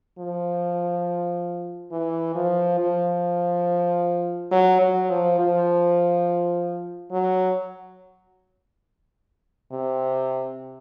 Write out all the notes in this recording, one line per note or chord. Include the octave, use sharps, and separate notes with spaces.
F3
E3
F3
F3
F#3
F#3
F3
F3
F#3
C3